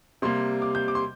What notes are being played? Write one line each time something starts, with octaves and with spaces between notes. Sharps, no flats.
C3 G3 A#3 C6
D6
G6
D6
C6